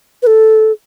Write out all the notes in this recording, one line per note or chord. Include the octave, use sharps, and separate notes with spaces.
B4
A4